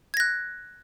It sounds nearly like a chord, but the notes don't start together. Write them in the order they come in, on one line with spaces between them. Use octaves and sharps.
G#6 A#6 F#6